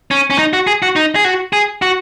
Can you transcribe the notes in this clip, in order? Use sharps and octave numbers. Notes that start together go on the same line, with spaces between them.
C#4
C#4
D#4
F#4
G#4
F#4
D#4
G#4
F#4
G#4
F#4